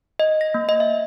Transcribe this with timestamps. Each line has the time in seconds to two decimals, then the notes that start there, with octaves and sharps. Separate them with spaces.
0.20 D#5
0.41 A#6
0.54 A#3
0.69 D#5
0.80 E5